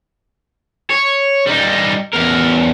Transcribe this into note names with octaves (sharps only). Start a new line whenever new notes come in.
C#5
G3 D#4
E2 A#4